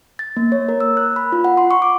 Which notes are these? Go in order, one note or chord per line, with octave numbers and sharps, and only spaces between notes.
A6
A#3
C#5
A#4
E6
F#6
B5
F4
F#5
C6
C#6
D6